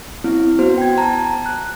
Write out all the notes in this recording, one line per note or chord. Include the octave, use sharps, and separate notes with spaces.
C4 C#4 E4
B3 F#4 C5
G5 G#6
A5 A#5
F#6